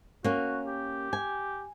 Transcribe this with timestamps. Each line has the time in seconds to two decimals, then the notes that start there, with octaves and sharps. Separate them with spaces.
0.24 A#3 C#4 F#4
0.67 G4
1.13 G#5